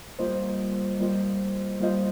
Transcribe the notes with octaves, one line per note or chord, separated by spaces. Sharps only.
G3 A#3 F4 C5 D#5
G3 A#3 F4 C5 D#5
G3 A#3 F4 C5 D#5